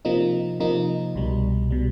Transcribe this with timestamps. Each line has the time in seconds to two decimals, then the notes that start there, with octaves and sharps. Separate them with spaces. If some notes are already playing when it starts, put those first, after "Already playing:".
0.05 C3 F3 A#3 D#4
0.60 C3 F3 A#3 D#4
1.15 C2 B2 G3
1.70 B2 G3